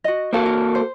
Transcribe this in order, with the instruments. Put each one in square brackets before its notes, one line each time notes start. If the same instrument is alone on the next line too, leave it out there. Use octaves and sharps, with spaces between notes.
[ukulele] F#4 D#5
[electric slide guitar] A#3 F#4 A4 [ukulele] C5 F5
[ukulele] A#4
C5